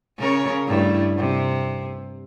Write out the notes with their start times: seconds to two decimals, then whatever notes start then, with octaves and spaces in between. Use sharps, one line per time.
0.17 C#3 A#4 C#5
0.67 G2 A3 E4
1.17 C3